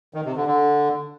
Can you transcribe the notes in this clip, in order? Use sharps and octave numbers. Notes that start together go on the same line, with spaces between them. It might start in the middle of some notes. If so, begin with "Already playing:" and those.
D#3
C3
D3
D3